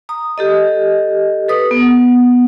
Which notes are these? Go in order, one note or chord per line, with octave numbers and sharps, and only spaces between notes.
A#5 D#6
G4 A4 D#5
A4 B4 D#6
B3